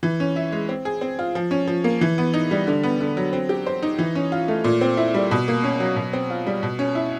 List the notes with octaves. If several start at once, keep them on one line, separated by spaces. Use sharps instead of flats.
E3
C#4
E4
G#3
C4
G#4
C4
F4
F3
C#4
F3
A#3
E3
B3
D#4
G3
D3
B3
D3
F#3
C4
G4
C5
D#4
E3
C#4
F4
A3
A#2
C4
E4
G3
B2
A#3
C#4
F#3
B2
C4
F4
G3
B2
C#4
E4